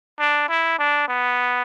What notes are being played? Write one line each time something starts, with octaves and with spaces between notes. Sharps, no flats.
D4
E4
D4
B3